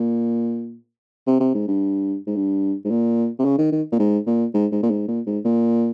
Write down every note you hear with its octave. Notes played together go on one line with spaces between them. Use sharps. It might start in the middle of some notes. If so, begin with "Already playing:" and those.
Already playing: A#2
C3
C3
G#2
G2
G#2
G2
G#2
A#2
C3
C#3
D#3
D#3
A#2
G#2
A#2
G#2
G#2
A#2
G#2
A#2
G#2
A#2